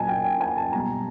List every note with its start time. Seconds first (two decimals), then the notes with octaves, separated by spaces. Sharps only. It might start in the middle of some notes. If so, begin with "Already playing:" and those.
Already playing: A#2 F#3 D#5 G#5 A5
0.08 G5
0.24 G5
0.41 G#5
0.57 A5
0.72 B2 G3 A#5